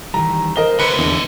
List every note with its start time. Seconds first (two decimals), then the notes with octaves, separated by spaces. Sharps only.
0.14 D#3 E3 G3 A#5
0.56 A#4 C5 D#5 G7
0.79 D3 F#3 B4 C#7
0.99 E2 D4 D#5